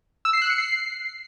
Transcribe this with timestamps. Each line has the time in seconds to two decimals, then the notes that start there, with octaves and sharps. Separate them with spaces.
0.25 E6
0.33 C7
0.42 F#6
0.50 C#7
0.58 C7